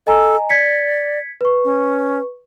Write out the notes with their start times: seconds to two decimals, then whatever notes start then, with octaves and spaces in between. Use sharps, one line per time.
0.07 A4 D#5 G#5 A#5
0.49 D5 G#6 B6 C#7
1.41 B4 C#6
1.64 C#4